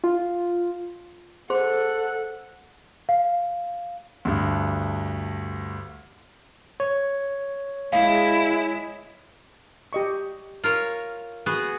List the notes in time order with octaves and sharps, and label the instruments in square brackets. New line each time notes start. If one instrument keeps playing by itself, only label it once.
[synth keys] F4
[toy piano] G#4 C5 C6 [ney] A4 [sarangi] F#5
[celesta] F5
[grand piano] D2 G2
[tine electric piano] C#5
[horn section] G#3 D#5 [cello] E4 [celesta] F5
[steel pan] G4 D#5 C#6
[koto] F4 A#4 C#5
B3 F#4 G#4